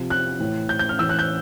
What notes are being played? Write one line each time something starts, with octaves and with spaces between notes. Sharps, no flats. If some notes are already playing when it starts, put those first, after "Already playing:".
Already playing: C3 F3
F#6
A2 E3
G6
G6
F6
A2 E3 E6
F#6
G6